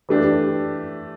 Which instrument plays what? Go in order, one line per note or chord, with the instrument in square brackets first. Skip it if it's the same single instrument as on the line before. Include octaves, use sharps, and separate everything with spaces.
[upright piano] E3 A3 D4 G4